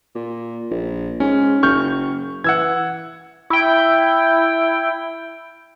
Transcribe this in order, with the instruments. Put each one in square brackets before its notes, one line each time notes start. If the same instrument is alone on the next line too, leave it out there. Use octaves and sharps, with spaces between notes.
[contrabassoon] A#2
A#1
[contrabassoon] G#2 [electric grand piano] C#4
[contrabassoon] F#1 [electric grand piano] C#6 F6 G6
[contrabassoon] E3 [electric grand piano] F#5 E6 G#6
[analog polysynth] E4 G5